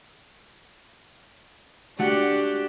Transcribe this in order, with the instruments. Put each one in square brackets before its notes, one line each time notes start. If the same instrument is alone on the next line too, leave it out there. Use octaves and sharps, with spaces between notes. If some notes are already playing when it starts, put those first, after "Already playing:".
[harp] A3 F#4 F#5 [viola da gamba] D4 G4